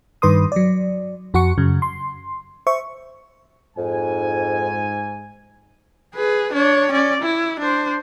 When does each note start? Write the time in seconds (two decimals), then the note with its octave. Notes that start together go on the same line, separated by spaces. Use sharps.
0.22 G2 D#3 B4 C6 D#6
0.52 F#3 D5
1.34 F2 F#4 F#5 C#6 C#7
1.58 F#2 C#3
1.82 C6
2.67 C5 E5 C#6
3.77 F2 G#2 G#5
6.15 G#4 B4
6.53 D4 C#5
6.92 C#4 D5
7.22 E4
7.60 D4 C5